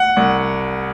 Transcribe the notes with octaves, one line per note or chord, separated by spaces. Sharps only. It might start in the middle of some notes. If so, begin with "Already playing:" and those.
Already playing: F#5
C2